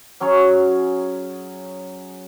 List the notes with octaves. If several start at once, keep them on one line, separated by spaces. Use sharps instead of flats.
F#3 C#4 G#4 C#5